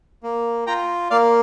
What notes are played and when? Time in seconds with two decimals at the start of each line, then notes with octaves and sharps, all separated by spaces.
0.23 A#3
0.67 F4 G5 A#5
1.10 A#3 D5 F5